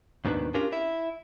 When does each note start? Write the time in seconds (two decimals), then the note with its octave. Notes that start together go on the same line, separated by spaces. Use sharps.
0.25 D#2 G#2 B2 D#3 D4 B4
0.54 C#4 D4 F4 G4 A#4
0.72 E4 E5